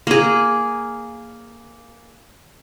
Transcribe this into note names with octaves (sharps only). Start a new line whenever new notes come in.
A#3 G#4